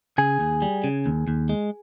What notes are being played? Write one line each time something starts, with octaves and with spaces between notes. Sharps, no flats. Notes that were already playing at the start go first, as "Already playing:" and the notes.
C#3 G#4 G#5
D#2
G3
C#3
D#2
D#2
G#3